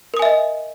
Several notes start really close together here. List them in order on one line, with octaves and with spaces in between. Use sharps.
A#4 D#6 G#5 E5 D#5